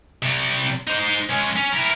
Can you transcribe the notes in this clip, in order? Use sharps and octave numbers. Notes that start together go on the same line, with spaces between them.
C3 G3
D#4 C5
G#3 C#4
C#4
E4 A#4